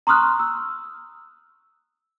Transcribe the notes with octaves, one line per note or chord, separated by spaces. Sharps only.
A#5 C6 C#6 D#6 F6 F#6
E6